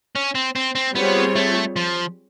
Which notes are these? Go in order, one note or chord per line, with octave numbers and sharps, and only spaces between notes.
C#4
C4
C4
C4
G3 B3 C4 F4 G#4 C#5
A3
F3